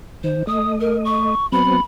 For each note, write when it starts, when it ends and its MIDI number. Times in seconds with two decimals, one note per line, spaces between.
0.24 0.43 51
0.24 0.46 72
0.47 1.35 57
0.47 1.35 75
0.47 0.71 87
0.81 0.97 70
1.05 1.46 85
1.52 1.81 54
1.52 1.81 59
1.52 1.81 60
1.52 1.81 83